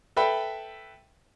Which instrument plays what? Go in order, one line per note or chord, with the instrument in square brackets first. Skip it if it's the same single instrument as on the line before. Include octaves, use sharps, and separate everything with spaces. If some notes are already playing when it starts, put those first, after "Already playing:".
[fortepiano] A4 B4 E5 G5 B5